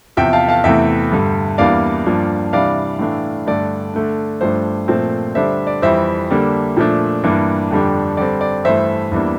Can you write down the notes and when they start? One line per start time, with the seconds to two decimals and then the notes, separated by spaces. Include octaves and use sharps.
0.17 E2 C3 F3 E5 G5
0.33 F5 A5
0.48 F5 A5
0.64 E2 C3 E3 A3 E5 G5
1.11 G2 D3 G3
1.58 E2 E3 G3 A#3 D4 D5 F5
2.06 G2 F3 A#3 D4
2.53 C3 E3 G3 D4 D5 F5
2.99 A2 E3 A3 D4
3.47 G2 D3 A3 D4 D5
3.94 D3 A3 D4
4.41 G2 F3 A3 D4 C5
4.88 A#2 F3 A3 C4
5.35 D3 G3 D4 C5 E5
5.67 D5
5.82 F2 E3 G3 C5 E5
6.30 D3 G3 A#3 D4
6.77 A#2 F3 A3 D4
7.24 G2 E3 A#3 D4
7.71 F2 D3 G3 D4
8.17 D3 G3 C4 D5
8.41 D5
8.65 G2 E3 A3 C5 E5
9.12 E2 E3 G3 A#3 D4